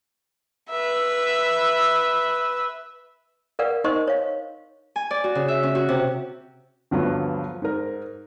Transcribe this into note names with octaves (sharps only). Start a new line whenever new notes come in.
B4 E5
A#4 B4 D5 F5 F#5
D#4 A#4 C5 D#5 C6 C#6
C#5 F5
G#5
D5
F#4
C#3
E5
C#4
F#4
C3
D2 G2 F3 F#3 B3
G#2 A#4